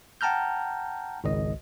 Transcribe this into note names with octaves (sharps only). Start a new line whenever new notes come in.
F#5 G5 A5 A#5 F6 G6
G#1 C#2 D#5